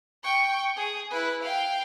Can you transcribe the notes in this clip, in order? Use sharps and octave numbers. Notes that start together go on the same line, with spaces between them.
G5 C#6
G#4
E4 B4
F5 G5